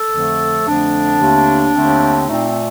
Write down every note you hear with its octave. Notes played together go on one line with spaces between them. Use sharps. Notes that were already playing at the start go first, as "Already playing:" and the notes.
Already playing: A4
F2 D3 F3 A3
F2 D3 F3 A3 D4
D#2 D3 A3 C4
D#2 D3 A3 C4
A#2 A3 C4 D#4